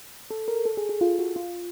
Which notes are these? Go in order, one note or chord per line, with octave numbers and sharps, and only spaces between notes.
A4
A#4
A4
G#4
G#4
F4
F#4
F4